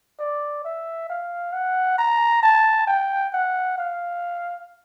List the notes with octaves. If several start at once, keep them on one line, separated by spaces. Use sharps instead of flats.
D5
E5
F5
F#5
A#5
A5
G5
F#5
F5